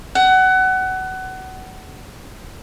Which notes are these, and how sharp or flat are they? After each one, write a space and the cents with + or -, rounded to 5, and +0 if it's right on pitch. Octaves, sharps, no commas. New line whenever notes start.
F#5 +25